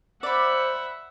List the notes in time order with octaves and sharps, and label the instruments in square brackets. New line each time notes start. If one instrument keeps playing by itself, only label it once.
[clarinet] C5 [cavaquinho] D5 B5 [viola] E5 F#5